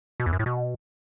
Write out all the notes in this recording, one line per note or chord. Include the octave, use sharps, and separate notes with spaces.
B2
E2
F#2
A2
B2